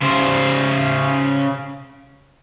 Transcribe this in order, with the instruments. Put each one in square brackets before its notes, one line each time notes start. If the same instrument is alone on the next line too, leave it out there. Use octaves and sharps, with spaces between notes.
[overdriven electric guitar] C#3 C5